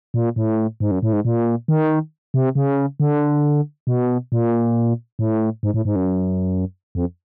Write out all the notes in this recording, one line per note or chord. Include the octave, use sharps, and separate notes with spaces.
A#2
A2
G#2
F#2
A2
G#2
A#2
D#3
C3
C#3
D3
B2
A#2
A2
G#2
A2
G#2
F#2
F2